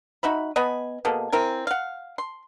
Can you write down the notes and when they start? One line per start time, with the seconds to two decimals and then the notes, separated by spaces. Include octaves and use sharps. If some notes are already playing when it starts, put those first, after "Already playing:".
0.23 D#4 F#4 E5 B5
0.56 B3 D#5 G#5 B5
1.05 B2 A#3 G#4 A4
1.32 C4 E4 A#4 G#5
1.67 F5 F#5
2.18 C6